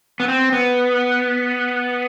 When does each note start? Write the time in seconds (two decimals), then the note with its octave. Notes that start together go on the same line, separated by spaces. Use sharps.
0.20 B3
0.28 C4
0.52 B3